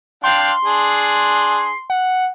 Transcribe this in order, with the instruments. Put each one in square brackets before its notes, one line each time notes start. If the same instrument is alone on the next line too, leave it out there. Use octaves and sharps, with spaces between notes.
[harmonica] D4 F5 G5 [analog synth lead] C6
[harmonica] D4 G#4
[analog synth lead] F#5